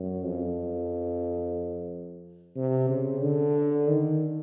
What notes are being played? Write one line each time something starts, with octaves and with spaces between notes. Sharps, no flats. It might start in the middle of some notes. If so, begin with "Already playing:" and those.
Already playing: F#2
F2
C3
C#3
D3
D#3